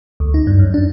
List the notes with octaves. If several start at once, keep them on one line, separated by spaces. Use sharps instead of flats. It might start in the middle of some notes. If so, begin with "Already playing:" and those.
D2
D#4
G2
F#2
D4